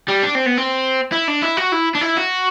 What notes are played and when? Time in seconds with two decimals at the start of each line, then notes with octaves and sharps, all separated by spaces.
0.08 G3
0.23 D4
0.35 C4
0.46 B3
0.57 C4
1.12 E4
1.28 D4
1.43 E4
1.57 F#4
1.72 E4
1.95 D4
2.01 E4
2.17 F#4